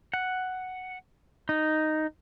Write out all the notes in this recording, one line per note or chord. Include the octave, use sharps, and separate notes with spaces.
F#5
D#4